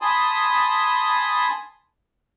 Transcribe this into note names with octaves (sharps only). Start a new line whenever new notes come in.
G#5 A5 B5 C6 D#6